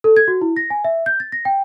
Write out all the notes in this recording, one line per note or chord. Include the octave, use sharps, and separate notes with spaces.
A4
G#6
F#4
E4
A#6
G#5
E5
G6
A6
A#6
G5